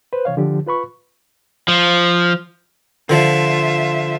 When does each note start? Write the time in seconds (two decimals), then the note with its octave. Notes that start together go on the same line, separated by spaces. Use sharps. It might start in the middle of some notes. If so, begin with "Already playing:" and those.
0.13 B4 C5
0.25 C3 E3 C#5 F5
0.37 D3 F3 G4
0.66 F4 B4 B5 C#6
1.68 F3
3.10 D3 F3 F4 E5